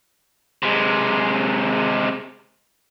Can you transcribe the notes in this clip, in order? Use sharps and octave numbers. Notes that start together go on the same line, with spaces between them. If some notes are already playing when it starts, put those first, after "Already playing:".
C3 G#3